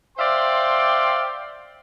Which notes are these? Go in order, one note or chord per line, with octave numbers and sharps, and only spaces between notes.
C5 D5 E5 F5 G5 C6